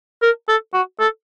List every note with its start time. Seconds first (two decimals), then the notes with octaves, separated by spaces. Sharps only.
0.22 A#4
0.49 A4
0.74 F#4
1.00 A4